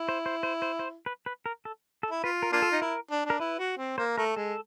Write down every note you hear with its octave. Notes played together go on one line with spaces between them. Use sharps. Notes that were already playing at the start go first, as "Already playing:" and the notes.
Already playing: E4
C5
C5
C5
C5
C5
B4
B4
A#4
A4
A4
E4
F4 B4
A#4
A#3 D4 F4
A4
D#4
E4 A#4
D4
D4 A#4
E4 B4
F#4
C4
A#3 C5
A3 A#4
G#3 A4